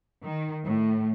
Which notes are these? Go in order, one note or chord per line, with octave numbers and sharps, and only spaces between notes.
D#3
A2